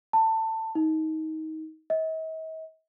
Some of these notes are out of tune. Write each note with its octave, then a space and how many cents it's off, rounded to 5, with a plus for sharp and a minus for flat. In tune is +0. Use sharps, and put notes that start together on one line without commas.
A5 +20
D#4 +20
D#5 +45